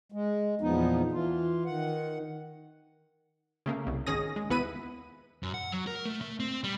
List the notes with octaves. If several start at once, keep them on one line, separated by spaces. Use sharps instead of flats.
G#3
E2 A#2 F3 B3 D#4
E3 F4
D#3 F#5
C#3 A3 A#3
C2
G#1 D#3 C#4 G#4 D#6 A#6
G#3
D#2 B3 E4 B4 B5 D#7
F#2
F#5
F#3
A#4
A3
A3
C4
G3